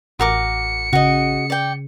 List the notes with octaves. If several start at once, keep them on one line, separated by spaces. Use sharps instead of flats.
A1 F#4 A#4 D6 C#7
C#3 F#4 D#5
D5 G5